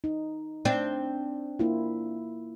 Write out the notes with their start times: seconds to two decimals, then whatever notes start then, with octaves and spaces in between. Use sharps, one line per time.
0.04 D#4
0.65 C4 D4
1.59 A#3 E4 F4